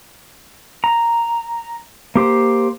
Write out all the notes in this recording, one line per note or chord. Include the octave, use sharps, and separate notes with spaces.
A#5
A#3 G4 C5